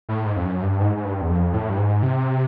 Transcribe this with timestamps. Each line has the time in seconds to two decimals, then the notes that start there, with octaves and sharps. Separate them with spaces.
0.09 A2
0.26 G#2
0.37 F2
0.45 F#2
0.62 G2
0.81 G#2
0.97 G#2
1.05 G2
1.21 E2
1.30 F2
1.54 A2
1.69 G2
1.78 G#2
2.03 C3